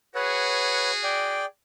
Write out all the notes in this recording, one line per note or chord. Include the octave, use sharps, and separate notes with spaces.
F#4 G#4 B4 C#5 F#5
D5 G5